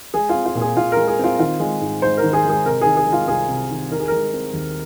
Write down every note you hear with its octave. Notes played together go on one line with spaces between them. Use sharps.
G#3 G#4
F4
C4
F4
A#2
G#4
A#2 F4
G#3 A#4
G#4
C4 F4
D#3 F4
G#3
G#2
G#2 C5
A#4
D#3
G#4
G#3 G#4
C3 A#4
D#3 G#4
G#4
G#3
F4
C2 G#4
C3
D#3
D#3 A#4
G#4
G#3 A#4
C4
D#2